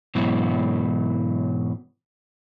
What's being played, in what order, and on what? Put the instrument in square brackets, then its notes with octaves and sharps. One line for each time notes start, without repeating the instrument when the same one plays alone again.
[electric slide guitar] G#2 B2 E3 F#3